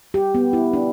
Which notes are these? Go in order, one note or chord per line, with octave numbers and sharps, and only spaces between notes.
G4
B3
E4
D4